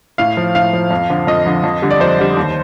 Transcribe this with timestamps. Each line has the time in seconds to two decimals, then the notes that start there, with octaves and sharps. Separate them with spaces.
0.18 A2 F5
0.37 F3
0.55 A2 F5
0.73 F3
0.91 F2
1.10 D3 F3
1.27 F2 D#5
1.46 D3 F3
1.64 F2
1.82 D3 G3
1.91 D5
2.00 F2 C5
2.19 D3 G3
2.37 D#2